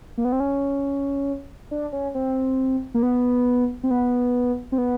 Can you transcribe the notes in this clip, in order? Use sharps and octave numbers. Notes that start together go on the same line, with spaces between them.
A#3
B3
C4
C#4
D4
C#4
C4
A#3
B3
C4
B3
C4
B3